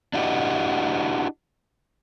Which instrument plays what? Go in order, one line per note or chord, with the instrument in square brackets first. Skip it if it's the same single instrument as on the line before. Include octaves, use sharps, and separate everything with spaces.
[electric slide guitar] D4 E4 F#4 G4 D5 D#5